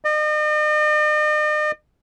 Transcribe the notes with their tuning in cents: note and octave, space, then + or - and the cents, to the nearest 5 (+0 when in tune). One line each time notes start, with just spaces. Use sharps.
D#5 -45